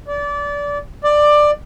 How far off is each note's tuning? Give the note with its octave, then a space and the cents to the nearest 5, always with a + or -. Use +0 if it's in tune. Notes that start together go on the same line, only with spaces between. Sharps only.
D5 -25
D5 +15